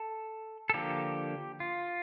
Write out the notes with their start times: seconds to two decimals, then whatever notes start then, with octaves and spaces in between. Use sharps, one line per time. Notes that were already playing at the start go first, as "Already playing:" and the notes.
Already playing: A4
0.70 A4
0.74 D3 F3 A#3 G4
1.60 F4